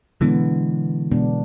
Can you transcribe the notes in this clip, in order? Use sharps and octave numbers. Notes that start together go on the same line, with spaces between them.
B2 D3 E3 G#3 B3 D4
B2 G#3 B3 D4